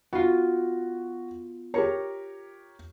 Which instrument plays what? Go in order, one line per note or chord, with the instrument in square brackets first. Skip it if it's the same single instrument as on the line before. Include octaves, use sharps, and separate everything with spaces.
[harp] B3 F4 [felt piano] F#4
[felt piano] G4 A#4 C#5 [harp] A#5 C#7